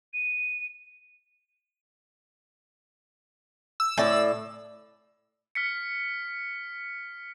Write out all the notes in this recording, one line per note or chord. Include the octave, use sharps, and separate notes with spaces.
D#7
E6
A2 D5
F6 B6 C#7